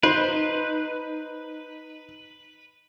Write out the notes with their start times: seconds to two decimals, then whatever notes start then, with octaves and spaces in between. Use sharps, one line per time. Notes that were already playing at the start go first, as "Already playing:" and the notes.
0.03 D#4 B4 C5